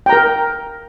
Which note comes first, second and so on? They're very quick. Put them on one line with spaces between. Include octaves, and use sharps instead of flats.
G5 A#5 A#4